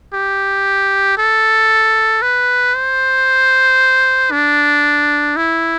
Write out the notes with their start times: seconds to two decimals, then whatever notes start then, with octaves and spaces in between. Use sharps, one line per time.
0.14 G4
1.18 A4
2.22 B4
2.75 C5
4.32 D4
5.37 E4